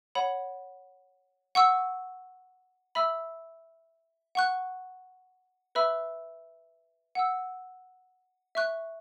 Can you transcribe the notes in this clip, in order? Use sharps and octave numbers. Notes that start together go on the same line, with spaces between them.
C#5 F#5 B5
F#5 C#6 E6
E5 B5 E6
F#5 C#6 F#6
B4 E5 B5 E6
F#5 E6
E5 C#6 F#6